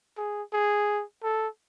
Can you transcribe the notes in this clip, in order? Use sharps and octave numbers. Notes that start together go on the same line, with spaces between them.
G#4
G#4
A4